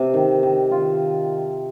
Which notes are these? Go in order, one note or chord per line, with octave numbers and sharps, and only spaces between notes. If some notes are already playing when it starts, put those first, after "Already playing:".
Already playing: C3
D#3
D#3
F4